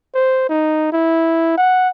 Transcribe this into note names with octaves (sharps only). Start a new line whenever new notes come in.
C5
D#4
E4
F#5